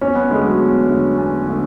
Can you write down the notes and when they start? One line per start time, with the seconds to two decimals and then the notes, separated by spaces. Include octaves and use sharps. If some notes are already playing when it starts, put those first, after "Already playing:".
0.01 E2 C#4
0.15 B3
0.30 D3 G#3 A3
0.45 F#3
0.59 E2
0.89 D3 A3
1.18 E2
1.46 D3 A3